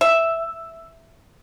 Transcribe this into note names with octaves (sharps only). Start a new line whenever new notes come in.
E5